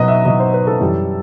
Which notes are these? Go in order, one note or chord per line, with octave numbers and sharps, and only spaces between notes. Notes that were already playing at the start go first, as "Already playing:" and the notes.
Already playing: B2 F#3 B4 D#5
E5
B2 F#3 D#5
C5
B4
A4
F#2 E3 G3